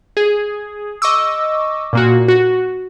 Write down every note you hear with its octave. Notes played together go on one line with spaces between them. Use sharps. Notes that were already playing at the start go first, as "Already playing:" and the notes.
G#4
D#5 C#6 D6 E6
A#2 A#3 F#4
F#4